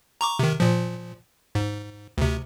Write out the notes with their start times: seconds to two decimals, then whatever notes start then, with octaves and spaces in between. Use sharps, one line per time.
0.21 A#5 C#6 D6
0.39 C3 D#3
0.60 A#2 F3
1.55 G#2
2.18 D2 C3